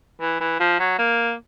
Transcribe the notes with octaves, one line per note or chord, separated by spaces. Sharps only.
E3
E3
F3
F#3
A#3